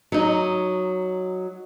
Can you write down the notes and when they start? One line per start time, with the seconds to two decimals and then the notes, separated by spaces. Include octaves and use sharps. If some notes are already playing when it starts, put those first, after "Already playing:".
0.12 F#3 D#4